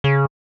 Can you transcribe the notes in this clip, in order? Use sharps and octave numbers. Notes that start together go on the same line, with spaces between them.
C#3